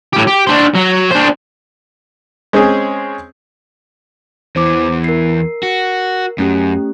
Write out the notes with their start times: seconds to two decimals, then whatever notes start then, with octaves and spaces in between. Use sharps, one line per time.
0.13 A2 G4
0.27 G4
0.47 D4 C5
0.75 F#3
1.12 D4 C5
2.53 G#3 C4 C#4 G#4
4.56 E2 E3 C5 D6
5.04 A#4 C7
5.63 F#4
6.38 F#2 A3 C#4 G4